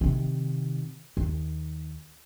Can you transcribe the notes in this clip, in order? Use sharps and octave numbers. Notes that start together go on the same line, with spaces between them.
C3 D#3
D#2